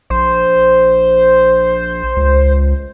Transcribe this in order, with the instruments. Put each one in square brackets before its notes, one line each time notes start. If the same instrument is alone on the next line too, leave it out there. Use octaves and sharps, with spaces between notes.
[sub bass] A#1 [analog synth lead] C5
[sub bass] C#2